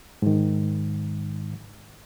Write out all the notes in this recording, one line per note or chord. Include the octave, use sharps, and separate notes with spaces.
G#2 D#3